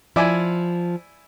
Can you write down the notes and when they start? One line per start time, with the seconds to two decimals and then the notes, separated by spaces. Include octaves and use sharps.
0.16 F3 E4 D5 G#5